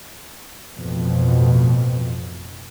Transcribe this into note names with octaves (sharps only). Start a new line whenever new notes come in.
A1 F2 B2